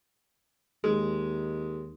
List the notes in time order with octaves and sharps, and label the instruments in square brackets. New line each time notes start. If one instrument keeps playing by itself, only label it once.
[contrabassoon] D#2 [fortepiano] G#3